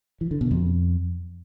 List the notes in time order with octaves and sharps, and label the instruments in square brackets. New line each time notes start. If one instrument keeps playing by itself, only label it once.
[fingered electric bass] E3
D3
B2
F2